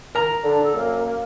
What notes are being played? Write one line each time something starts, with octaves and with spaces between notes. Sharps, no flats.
A#4 A#5
D3 D4
A4
F#2 A#3